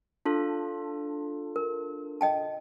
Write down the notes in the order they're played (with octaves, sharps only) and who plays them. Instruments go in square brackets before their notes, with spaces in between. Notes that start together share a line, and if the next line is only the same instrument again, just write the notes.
[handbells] D4 F4 A4
[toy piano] A#4
D#5 G5 A5